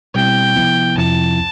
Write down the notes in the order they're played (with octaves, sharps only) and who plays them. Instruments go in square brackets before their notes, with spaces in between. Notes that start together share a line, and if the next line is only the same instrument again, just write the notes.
[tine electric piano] B2 G3 C4 E4 [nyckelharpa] G5
[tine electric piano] C3 F3 B3 E4
[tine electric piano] F2 C3 F3 C4 E4 [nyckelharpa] A5